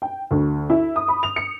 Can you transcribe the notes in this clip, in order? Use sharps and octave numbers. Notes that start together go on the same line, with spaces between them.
G5
D2
E4
D#6
B5
F7
C#7